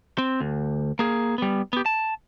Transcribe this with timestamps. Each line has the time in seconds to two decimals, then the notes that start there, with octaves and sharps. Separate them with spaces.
0.18 C4
0.41 D2
0.99 A#3 G#4
1.38 G3 B3
1.73 B3 G4
1.86 A5